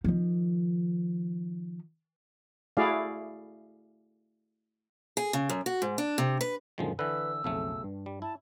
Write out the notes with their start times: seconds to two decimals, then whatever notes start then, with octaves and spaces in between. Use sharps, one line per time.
0.04 D#3 F3
2.77 A3 E4 F#4 G#4 D5 F5
5.17 G#4
5.33 C#3
5.49 F#2
5.66 F#4
5.82 G#2
5.98 D4
6.18 C3
6.41 B4
6.78 F#2 A#2 D3 D#3 F3 G#3
6.99 D3 E3 B4 E6
7.44 B1 F2 C#3 A3
7.84 G2
8.06 G3
8.22 E4 A5